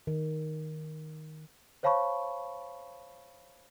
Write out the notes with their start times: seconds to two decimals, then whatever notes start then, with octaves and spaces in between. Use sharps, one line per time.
0.07 D#3
1.83 C5 C#5 F5 A5 B5 C#6